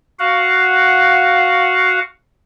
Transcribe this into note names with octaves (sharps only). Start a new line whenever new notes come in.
F#4 F5 F#5